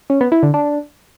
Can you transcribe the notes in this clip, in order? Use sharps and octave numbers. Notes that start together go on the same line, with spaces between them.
C#4
B3
E4
D3
D4